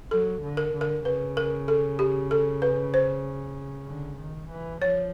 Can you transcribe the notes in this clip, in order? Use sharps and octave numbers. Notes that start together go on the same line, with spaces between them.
F#3 A4
D3
A#4
D3
A#4
C#3 B4
A#4
A4
G4
A4
B4
C5
D3
D#3
E3
F3 C#5